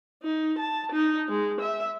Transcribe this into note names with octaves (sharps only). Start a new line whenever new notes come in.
D#4
A5
D#4
G#3
E5